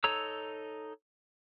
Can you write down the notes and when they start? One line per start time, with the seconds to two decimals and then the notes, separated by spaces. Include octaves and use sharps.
0.04 D#4 A4 C#5 A#5 E6